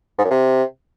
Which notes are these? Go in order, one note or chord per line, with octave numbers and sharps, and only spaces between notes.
G#2
F#2
C3